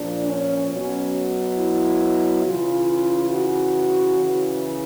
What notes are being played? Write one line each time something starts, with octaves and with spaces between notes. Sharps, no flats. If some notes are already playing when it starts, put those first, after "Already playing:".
Already playing: A#2 F3 D4
C#4
B2 F#3 C#4
E4
C#3 E3 F4
F#4
C#3 E3